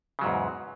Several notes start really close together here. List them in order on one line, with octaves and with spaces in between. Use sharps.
C#3 F#3 G#2 E2